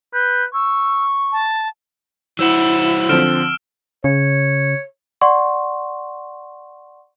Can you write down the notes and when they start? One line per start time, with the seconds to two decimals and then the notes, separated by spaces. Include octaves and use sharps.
0.14 B4 G6
0.54 C#6 E6
1.32 A5
2.39 F#3 E4 C5 F#5 E6 E7
3.09 D3 F3 C4 F6 D7 E7
4.04 C#3 C#5
5.21 D5 F#5 C6 C#6